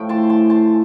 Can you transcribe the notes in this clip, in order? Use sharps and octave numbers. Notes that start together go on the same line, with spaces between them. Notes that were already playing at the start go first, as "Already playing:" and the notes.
Already playing: A2 F3 A3 G5
A5 C6
A5 C6
A5 C6